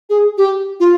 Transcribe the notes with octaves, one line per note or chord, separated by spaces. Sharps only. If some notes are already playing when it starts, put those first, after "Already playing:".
G#4
G4
F4